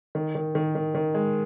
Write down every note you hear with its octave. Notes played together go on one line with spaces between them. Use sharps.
D#3
D#3
D#3
D#3
D#3
G#3